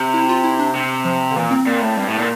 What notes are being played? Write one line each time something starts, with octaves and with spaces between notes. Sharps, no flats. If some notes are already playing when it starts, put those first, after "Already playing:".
Already playing: C3
E4
F4
E4
D4
C3
F3
D3
A#2 E3
C4
A#2
A2
G2
A2
A#2